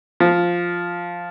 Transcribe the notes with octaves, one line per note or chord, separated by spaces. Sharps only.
F3